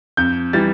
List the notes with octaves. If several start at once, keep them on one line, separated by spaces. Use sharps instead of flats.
F2 G6
E3 G3 A6